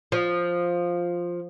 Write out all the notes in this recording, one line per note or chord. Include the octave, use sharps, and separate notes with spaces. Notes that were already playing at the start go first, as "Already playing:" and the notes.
F3